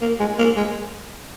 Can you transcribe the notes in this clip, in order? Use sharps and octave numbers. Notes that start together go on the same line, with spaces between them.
A#3
G#3
A#3
G#3